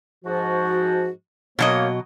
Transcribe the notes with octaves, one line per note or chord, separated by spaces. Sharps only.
G#2 F3 F#4
B2 F#3 A#3 C#5 D#5